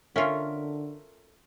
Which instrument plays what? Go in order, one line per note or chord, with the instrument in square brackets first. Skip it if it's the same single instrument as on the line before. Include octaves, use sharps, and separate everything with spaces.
[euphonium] D3 [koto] C#4 F4 [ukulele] A4 A#4 E5